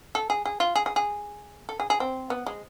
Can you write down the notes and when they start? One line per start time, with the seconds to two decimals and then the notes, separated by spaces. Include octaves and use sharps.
0.15 A4
0.30 G#4
0.46 G#4
0.60 F4
0.76 G#4
0.86 G#4
0.96 G#4
1.69 A4
1.80 G#4
1.90 G#4
2.00 C4
2.30 B3
2.46 G#3